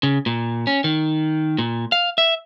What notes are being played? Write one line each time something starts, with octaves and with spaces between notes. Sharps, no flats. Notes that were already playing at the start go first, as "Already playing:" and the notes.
C#3
A#2
C#4
D#3
A#2
F5
E5